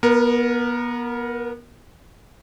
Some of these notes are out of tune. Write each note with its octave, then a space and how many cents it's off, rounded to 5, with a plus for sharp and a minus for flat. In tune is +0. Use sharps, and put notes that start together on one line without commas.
B3 -30 A#4 +5